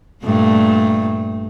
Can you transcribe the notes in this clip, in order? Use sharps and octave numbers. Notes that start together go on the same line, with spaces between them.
G2 A#2 A3